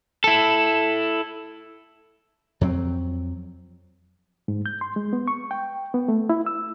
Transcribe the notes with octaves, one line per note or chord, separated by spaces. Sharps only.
E4 A4
F2 F#3 G#3 C4
G#2
G6
C6
G#3
B3
C#6
G5
B3
A3
E4
E6